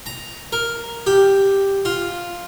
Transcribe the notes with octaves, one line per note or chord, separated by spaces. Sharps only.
A#5
A#4
G4
F4